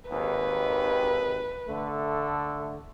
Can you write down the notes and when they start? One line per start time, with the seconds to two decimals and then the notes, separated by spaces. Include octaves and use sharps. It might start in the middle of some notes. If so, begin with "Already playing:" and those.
0.10 G#1 D#2 B4
1.68 D3 A3